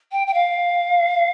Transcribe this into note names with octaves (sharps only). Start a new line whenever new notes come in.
G5
G5
F5